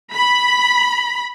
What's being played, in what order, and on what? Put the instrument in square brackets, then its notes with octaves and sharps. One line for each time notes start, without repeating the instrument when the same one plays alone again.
[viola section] B5